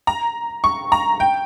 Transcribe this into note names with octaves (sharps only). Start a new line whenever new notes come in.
A#5
C#6
A#5
G5